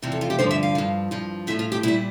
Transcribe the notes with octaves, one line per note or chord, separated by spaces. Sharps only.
E2 C3 F3
A4
F4
G4
G2 D3 F3 C5
E5
F5
G2 F3
G2 F3
A2 F3 E5
F4
G4
A#2 G3 E4